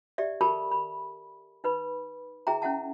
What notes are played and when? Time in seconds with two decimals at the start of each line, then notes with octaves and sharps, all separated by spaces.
0.18 G4 D5 E5
0.41 G4 A4 A#4 A5 B5 C#6
0.71 B5
1.64 D#4 B4 B5
2.47 E4 G#4 E5 G5 A#5
2.62 C#4 E4 E5 F#5 A5